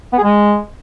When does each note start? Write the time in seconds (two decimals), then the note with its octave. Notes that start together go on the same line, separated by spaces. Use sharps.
0.13 B3
0.18 G#4
0.23 G#3